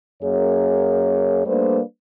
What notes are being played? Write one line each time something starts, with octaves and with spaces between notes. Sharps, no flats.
F#2 A#3 G#4 C#5
G3 A3 A#3 D4 B4 C5